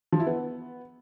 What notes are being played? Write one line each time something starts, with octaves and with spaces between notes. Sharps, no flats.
F3
E4
B3